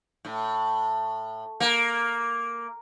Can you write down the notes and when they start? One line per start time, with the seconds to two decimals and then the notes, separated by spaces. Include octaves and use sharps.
0.25 A2
1.60 A#3